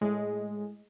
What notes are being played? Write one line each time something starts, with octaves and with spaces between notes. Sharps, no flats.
A2 G#3